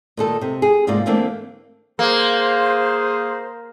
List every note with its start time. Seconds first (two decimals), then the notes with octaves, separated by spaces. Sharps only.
0.17 A#2 D#3 A4
0.41 C3
0.62 G#4
0.87 G#2 C3 A#3 F4 A#4 D5
1.06 D3 E3 A3 A#3 C4 D4
1.99 A#3 G#4 C5